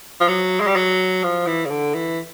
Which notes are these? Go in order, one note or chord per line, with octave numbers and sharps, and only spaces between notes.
F3
F#3
G#3
G3
F#3
F3
E3
C#3
D3
E3